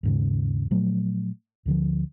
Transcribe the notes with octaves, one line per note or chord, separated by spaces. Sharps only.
D#2 G#2 C#3
A#2 F3 F#3 A3
D2 D3 F3